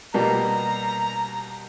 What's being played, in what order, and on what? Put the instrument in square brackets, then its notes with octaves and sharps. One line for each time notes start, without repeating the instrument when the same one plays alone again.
[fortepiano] B2 G3 A#3 [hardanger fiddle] A#5